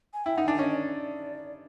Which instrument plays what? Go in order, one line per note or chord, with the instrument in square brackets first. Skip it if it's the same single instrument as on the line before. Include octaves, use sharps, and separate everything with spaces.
[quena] G#5
[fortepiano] E4 [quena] G5
[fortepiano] D#4 [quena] F#5
[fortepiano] D4 [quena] G#5
[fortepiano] C#4 [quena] D#5
[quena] D#5
D5